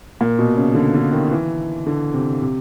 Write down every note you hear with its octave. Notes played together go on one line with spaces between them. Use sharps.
A#2
B2
C#3
D3
D3
D#3
E3
D3
C3
C3